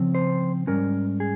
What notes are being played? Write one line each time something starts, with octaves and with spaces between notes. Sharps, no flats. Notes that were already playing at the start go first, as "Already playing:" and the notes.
Already playing: C#3 F3 C4
C5
G#2 G3 C#4 A#4
G#4